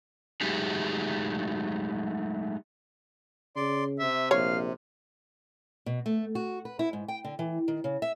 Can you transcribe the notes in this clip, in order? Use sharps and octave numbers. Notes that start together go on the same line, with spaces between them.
F#3 G#3 A3 D#4 G4 G#4
C#3 D5 C6
C3 E5
A#1 C#5 F5
B2
A3
F#4
B4
E4
G#2
G5
D3
E3
D#3
C#3
E5